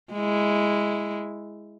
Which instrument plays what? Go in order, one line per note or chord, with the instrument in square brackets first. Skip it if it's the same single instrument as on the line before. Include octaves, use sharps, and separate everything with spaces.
[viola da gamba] G#3 E4